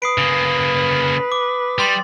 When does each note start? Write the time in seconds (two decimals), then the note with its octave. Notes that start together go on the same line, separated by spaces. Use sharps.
0.02 B4 D#6 C7 D7
0.18 C#3 A#3
1.32 D6
1.79 G3 C6 A6